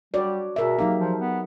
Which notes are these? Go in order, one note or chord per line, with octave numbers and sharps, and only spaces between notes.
G3 F#4 C#5 D5
B2 G#4 A#4 E5
F#3 A#3 D#4 G4
F3
B3